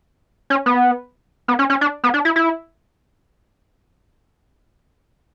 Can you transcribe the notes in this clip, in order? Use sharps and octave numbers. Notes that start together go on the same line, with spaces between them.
C#4
B3
B3
C#4
C#4
D4
B3
D4
E4
E4